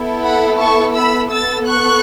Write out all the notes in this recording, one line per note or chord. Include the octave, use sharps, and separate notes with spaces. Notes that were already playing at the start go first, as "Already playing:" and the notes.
Already playing: B3 E4 A4
F#5 B5
A5 C#6
B5 E6
B3 A4 E6 A6
C#6 F#6